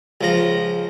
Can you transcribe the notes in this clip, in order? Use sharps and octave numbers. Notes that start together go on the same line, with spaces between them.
C#2 F3 A#5